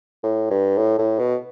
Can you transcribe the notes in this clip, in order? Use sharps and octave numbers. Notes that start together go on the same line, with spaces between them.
A2
G2
A2
A2
B2